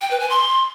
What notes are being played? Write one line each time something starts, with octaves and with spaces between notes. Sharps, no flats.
G5
B4
G#5
C6